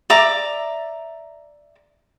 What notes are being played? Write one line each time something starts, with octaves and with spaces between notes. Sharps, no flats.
D5 E5 A#5 D6